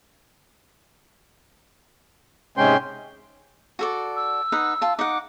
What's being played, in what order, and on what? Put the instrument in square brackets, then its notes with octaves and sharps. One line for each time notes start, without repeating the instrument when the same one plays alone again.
[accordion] G#2 C3 G#3 [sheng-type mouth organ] C#4 G5 C6
[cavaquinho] F#4 A4 D5
[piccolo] E6
[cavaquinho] D#4 B4 F#5
F4 A5
[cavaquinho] D#4 F#5 [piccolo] D6